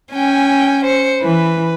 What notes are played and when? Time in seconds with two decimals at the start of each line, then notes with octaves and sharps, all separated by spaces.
0.13 C#4 G5 G#5
0.85 C5 C#7
1.22 E3 B4